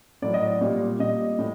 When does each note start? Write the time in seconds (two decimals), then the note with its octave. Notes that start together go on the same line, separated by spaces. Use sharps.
0.22 A2 F#3 D5
0.34 D#5
0.46 D5
0.61 A#2 G3
0.99 A#2 G3 D#5
1.39 A2